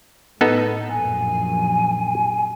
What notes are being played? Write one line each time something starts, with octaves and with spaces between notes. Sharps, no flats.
A2 B3 D#4 A4
A#1 F#2 G#5